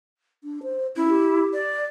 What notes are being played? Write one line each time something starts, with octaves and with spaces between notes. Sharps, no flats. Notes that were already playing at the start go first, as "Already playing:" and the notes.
D4
C5
C#4 E4
G4
D5